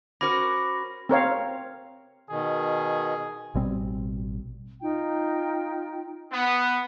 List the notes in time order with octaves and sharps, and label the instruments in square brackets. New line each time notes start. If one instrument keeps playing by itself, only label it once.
[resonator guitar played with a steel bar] C#4 F#4 A#4 [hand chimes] C5 D6 [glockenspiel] B5 A#6
[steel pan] C4 A#4 C#5 F5
[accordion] B2 D#3 [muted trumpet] G#4
[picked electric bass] A1 B2 G3 C4
[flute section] D#4 F4 G5
[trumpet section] B3